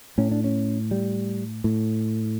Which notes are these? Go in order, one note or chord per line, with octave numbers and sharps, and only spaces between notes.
A2 C#4
D4
C#4
G3
A2